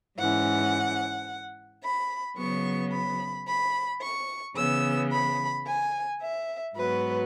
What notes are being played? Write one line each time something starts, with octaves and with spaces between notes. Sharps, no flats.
G#2 E3 C#4 F#5
B5
C#3 F#3 B3 C#6
B5
B5
C#6
C#3 E3 B3 E6
B5
G#5
E5
G#2 F#3 B3 B4